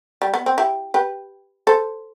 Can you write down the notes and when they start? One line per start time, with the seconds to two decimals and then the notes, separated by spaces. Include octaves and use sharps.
0.22 G3
0.34 B3
0.46 C4
0.58 E4 G4
0.94 G4 B4
1.67 A4 C5